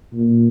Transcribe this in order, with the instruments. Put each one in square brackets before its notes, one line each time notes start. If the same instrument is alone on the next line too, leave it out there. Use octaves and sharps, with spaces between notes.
[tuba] A#2